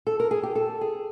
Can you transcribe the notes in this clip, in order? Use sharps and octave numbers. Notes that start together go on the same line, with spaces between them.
A4
A#4
G#4
G4
A4
G#4